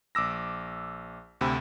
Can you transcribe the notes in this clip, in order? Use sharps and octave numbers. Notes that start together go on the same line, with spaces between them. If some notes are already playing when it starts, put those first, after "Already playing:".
A#1 D6 E6 A#6
D2 C3 C4 B5